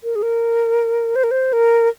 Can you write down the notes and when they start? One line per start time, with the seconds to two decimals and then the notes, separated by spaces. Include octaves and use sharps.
0.04 A#4
0.16 G#4
0.23 A#4
1.16 C5
1.24 A#4
1.31 C5
1.53 A#4